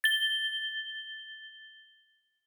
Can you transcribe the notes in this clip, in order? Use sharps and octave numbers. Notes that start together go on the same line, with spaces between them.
A6 G7